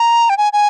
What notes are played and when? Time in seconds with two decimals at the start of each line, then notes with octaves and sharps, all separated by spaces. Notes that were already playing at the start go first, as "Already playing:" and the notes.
Already playing: A#5
0.30 G5
0.38 G#5
0.53 G#5